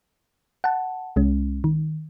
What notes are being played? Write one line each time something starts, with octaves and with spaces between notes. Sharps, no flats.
F#5 A5
C2 G#3 C#4
D#3